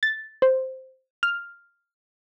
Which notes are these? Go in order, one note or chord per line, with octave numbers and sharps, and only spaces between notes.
A6
C5
F6